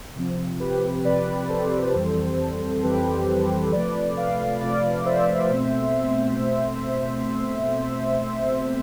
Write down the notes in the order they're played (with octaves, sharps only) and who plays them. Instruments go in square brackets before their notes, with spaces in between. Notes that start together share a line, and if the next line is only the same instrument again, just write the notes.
[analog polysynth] C3 F3 C4
G4 B4
C3 F3 C4 B4 D5
A4 C5
F2 E3 G3 C4
F2 E3 G3 C4 G4 B4
C3 F3 A3 B4 D5
D5 F5
C3 F3 A3 D5 F5
C5 E5
B2 A3 C4
B2 A3 C4